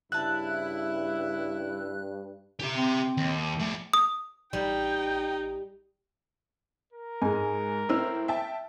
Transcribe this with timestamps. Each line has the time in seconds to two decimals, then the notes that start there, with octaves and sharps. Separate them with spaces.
0.12 G2 C#3 E4 E5 A5 F#6
2.59 G4 E5
2.77 C4
3.17 D#2
3.59 F3 A3 G#4
3.93 D#6
4.53 A1 G3 D#4 G5
6.93 A#4
7.22 G#2 G#3 G#5
7.89 A2 C4 E6 F6
8.28 E5 G5 A5